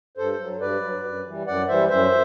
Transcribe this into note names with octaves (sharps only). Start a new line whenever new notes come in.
G2 A4 C5
F#3
G2 B4 D5
F#3
F#2
E3 G3
F#2 D5 F#5
E3 G3 C5 E5
F#2 C5 E5